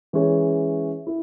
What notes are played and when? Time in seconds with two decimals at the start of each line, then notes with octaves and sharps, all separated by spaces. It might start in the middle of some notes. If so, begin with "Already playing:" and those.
0.13 E3 G#3 C#4 G#4 C#5
1.07 E4